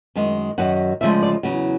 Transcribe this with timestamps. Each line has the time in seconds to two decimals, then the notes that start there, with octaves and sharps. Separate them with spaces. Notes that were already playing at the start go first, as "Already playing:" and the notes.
0.15 F#2 D#3 G#3
0.58 F#2 D#3 F#3 F#5
1.01 D2 C#3 F3 G#3 E5
1.23 D5
1.43 E2 C#3 F#3